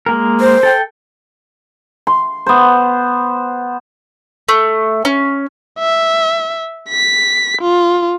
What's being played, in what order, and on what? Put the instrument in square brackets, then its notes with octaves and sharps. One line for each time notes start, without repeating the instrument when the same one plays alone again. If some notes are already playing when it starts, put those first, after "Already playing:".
[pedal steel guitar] G#3 A#3 A#4
[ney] C5
[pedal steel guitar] A4 G5
[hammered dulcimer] C6
B3 C5
[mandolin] A3
C#4
[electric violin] E5
B6
F4